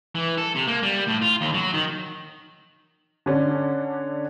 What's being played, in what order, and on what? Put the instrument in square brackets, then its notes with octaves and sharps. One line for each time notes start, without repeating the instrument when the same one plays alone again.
[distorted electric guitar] E3
A4
C3
A#3
G3
A2
F4
D#2
F#3
D#3
[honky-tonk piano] D3 C#4 D4